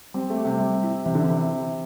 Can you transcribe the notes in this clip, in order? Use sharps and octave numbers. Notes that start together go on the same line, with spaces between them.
G3 C4
A3
G3
C3
G3
E4
C3 E3
D3
C3
E3
E3